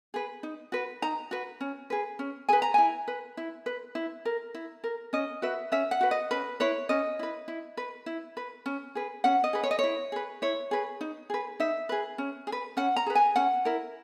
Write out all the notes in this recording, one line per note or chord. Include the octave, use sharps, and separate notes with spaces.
G#4 B4
D#4
F#4 B4
D#4 A#5
F#4 B4
C#4
G#4 B4
C#4
G#4 B4 G#5
A#5
E4 G#5
B4
E4
B4
E4
A#4
E4
A#4
C#4 D#5
F#4 B4 E5
C#4 E5
F#5
F#4 B4
D#5
C#4 B4
E4 B4 C#5
C#4 D#5
E4 B4
E4
B4
E4
B4
C#4
G#4 B4
C#4 F#5
D#5
G#4 B4
C#5
D#5
E4 C#5
G#4 B4
E4 C#5
G#4 B4
D#4
G#4 B4
D#4 E5
G#4 B4
C#4
G#4
B4
C#4 F#5
A#5
G#4 B4
G#5
C#4 F#5
E4 A#4